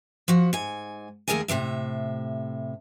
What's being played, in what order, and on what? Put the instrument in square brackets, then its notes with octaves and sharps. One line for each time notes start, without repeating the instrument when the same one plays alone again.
[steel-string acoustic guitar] F3 F#4
G#2 G#5
D#2 A3 G#4 A#4 D#5 G#5
A2 C3 F#3 E5